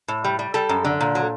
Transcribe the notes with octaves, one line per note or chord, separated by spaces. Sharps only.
A2
G3
G3
G3 A4
F#2
D3
A#2
F#3